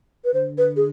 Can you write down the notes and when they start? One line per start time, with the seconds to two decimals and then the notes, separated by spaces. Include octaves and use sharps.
0.25 B4
0.34 D3 C5
0.58 B4
0.76 G#4